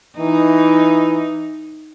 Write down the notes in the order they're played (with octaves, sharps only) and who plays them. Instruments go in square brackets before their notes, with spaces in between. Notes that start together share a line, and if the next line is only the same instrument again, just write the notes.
[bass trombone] E3 [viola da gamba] D#4